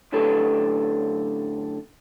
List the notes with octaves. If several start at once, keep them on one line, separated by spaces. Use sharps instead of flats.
F#2 A2 D3 G4 A4 B4